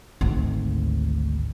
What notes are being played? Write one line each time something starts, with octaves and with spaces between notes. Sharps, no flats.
G#1 D2